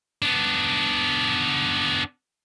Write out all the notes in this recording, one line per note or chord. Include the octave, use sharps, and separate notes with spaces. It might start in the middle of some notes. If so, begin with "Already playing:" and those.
B3 D4